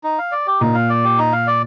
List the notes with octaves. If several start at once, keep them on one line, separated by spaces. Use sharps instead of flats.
D#4
F5
D5
G4
A#2 D#4
F5
D5
G4
D#4
F5
D5